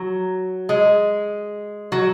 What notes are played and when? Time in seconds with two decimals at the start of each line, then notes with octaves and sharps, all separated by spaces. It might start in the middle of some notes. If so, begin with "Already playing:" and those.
Already playing: F#3
0.69 G#3
1.92 F#3